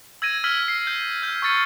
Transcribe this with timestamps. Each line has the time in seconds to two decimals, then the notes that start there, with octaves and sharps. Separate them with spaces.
0.22 E6 G#6 A#6 D#7
0.44 E6 F6 G#6 B6 G7
0.68 C7
0.87 G6
1.22 F6 G6
1.42 C#6 F6 A6 C#7